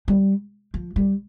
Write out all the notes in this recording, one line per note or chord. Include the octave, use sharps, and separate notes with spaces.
G3
F3
G3